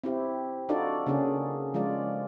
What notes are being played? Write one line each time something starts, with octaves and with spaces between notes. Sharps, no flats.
C4 E4 G4
D4 D#4 F4 F#4 A4 D5
C#3 A#3 C#4 D4 G#4
F3 G#3 F4 D5